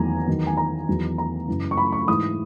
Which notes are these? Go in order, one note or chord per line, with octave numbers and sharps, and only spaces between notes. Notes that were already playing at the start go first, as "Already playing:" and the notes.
Already playing: E2 D#3 F#3 G#5 A#5
E2 D#3 F#3
G#5
A#5
E2 D#3 F#3
A#5
F#2 C#3 E3
C#6
B5
C#6
G#2 E3 D#6